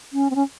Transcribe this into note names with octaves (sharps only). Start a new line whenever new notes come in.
C#4
C4
C#4